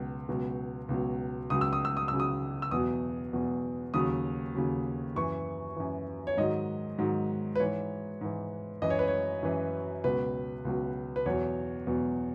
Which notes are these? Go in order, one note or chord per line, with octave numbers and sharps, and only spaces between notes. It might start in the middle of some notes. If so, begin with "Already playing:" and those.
Already playing: C#2 B2 F#3
C#2 B2 F#3
C#2 B2 F#3
C#2 C#3 F#3 D#6
E6
D#6
E6
D#6
C#2 C#3 F#3 E6
D#6
E6
E2 B2 F#3 D#6
E2 B2 F#3
D#2 C#3 F#3 D#6
D#2 C#3 F#3
F#2 E3 C#6
F#2 E3
C#5
G#2 D#3 F#3 D#5
G#2 D#3 F#3
B4
G#2 E3 C#5
G#2 E3
F#2 E3 D#5
C#5
B4
C#5
F#2 E3
C#2 B2 F#3 B4
C#2 B2 F#3
B4
E2 B2 F#3 C#5
E2 B2 F#3